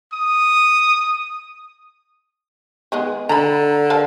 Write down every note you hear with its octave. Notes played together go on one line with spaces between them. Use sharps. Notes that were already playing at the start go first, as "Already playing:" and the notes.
D#6
D#3 G#3 B3
D3 A#5 B5
A#4 F5 A5